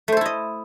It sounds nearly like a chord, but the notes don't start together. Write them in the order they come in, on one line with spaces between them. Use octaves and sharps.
A3 C5 A4 E4 D#5